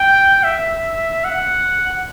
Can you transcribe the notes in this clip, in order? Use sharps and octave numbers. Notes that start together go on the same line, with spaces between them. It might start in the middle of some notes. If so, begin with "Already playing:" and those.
Already playing: G5
E5
F#5